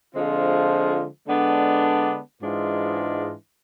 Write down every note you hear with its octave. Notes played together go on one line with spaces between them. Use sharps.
D3 F3 G#3 C4 F4
D3 G#3 B3 D4
G#2 E3 G#3 D4 F4